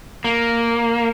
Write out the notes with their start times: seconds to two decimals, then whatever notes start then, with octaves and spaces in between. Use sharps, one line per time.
0.24 A#3